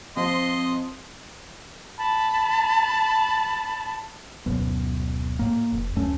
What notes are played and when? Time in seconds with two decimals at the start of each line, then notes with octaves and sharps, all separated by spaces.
0.17 F3 C4 D#5 C6
1.97 A5 B5
4.46 D1 F#2 B2 B3
5.39 A2 A#3
5.72 F1
5.96 D1 F#2 A3 C#4